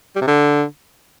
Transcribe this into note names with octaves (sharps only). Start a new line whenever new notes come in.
G3
C3
D3